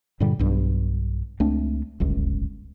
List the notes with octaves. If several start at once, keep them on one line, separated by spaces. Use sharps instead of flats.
G2 A#2 D3 G3
B1 G2
C#2 A3 C4 D4
D1 G1 C#2